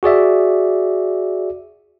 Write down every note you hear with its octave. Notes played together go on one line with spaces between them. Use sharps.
F#4 G#4 D5 E5